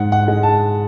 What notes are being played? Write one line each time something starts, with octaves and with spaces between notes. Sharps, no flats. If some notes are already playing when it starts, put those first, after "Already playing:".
Already playing: G#2 F#5
F#5
G#3
A5